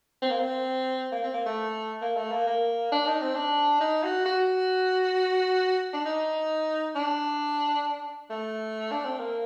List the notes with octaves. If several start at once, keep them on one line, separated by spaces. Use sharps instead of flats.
C4
A#3
C4
A#3
C4
A#3
A3
A#3
A3
A#3
A#3
D4
D#4
C4
D4
D#4
F#4
F#4
D4
D#4
D4
A3
D4
C4
A#3